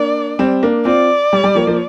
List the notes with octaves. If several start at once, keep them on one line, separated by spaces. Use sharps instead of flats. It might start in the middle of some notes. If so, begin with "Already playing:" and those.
Already playing: A#3 D4 D5
G3 C4
A#3 D4
C4 F4 D5
G3
G3
F3 A#3
F3 A#3